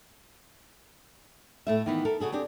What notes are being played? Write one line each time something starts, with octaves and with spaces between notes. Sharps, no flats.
A2 A3 E5
D#3 E3 B3
A4 A#4
C#3 F#4 G#4 A4
C4 D4 G4 G#4